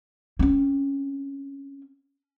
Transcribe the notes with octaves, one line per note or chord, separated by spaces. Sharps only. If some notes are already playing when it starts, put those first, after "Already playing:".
C4 C#4